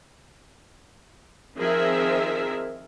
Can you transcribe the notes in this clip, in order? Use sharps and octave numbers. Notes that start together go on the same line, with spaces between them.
D#3 F3 C4 G#4 A#4 E5